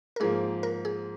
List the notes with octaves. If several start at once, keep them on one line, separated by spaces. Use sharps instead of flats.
A#4
G#2 F3 A#3 G#4
A#4
G#4